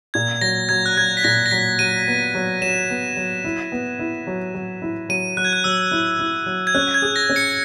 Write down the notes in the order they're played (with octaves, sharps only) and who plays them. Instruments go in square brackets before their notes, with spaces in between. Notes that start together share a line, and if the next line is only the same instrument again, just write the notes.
[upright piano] A#2 [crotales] G#6
[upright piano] F#3 [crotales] A#6
[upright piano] F#3 [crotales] G#6
[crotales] F#6
[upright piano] F#3 [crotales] G#6
[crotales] B6
[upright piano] A#2 [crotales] A#6
[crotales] A#6
[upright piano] F#3 [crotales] B6
[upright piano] F#3 [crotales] D#7
[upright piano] B3
F#3
[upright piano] F#3 [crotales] E7
[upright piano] B3
F#3
E4
B3
E4
F#3
F#3
E4
[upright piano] F#3 [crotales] D#7
[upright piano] F#3 [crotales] F#6
[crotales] G#6
F#6
[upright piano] F#3 [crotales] E6
[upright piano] E4
E4
F#3
[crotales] G#6
[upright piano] C#4 [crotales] F#6
[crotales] G#6
[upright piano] G#4
[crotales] A#6
[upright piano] C#4
[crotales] C#7